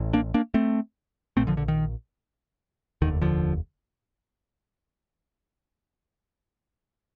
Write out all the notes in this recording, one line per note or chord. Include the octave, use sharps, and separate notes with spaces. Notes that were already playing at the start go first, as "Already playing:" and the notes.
Already playing: A1 A2
A#3 D4
A#3 D4
A3 C4
A#1 A#2 A3 C4
D3 F3
D3
D#3
F1 D#2 D3 D#3
D3 F3